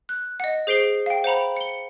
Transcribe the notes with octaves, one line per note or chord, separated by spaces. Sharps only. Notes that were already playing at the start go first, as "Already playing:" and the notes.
F#6
D#5 F#5
G#4 C5 C7 D7 G7
F5 G5
C5 F#5 A#5 B5
C#7 G7